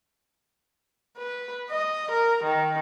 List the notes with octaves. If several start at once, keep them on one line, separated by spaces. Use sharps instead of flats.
B4
D#5
A#4
D#3